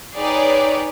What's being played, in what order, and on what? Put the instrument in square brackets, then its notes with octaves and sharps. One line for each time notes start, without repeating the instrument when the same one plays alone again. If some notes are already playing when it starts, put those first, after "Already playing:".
[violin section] D#4 G#4 B4 C#5 D5 G5